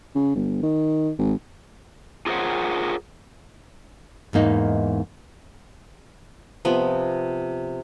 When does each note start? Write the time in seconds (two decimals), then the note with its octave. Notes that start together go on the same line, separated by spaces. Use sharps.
0.15 C#3
0.35 G1
0.63 D#3
1.19 G#1
2.26 F4 G#4 A#4 C5 C#5 F#5
4.33 E2 G#2 A#3 D#4
6.65 C3 F3 B3